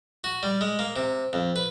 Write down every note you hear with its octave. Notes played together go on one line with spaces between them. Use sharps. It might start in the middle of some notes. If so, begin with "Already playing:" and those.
F#4
G3
G#3
A#3
C3
F2
B4